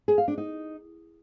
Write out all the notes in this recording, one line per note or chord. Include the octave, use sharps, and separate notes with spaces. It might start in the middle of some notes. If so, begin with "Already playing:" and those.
G#4
F5
D4
D#4